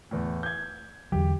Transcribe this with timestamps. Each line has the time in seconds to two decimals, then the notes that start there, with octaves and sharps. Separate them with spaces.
0.11 E2 A2
0.43 G6 G#6
1.12 E2 D3 F#3 G4